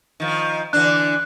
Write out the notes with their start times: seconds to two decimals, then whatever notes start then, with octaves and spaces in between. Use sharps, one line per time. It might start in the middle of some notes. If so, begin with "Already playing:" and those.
0.20 D#3 F3
0.73 D3 E3 D4 F#6